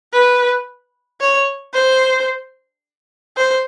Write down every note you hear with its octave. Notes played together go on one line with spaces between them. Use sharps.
B4
C#5
C5
C5